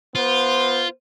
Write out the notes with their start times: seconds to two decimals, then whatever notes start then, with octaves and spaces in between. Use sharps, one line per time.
0.15 B3 F4 C5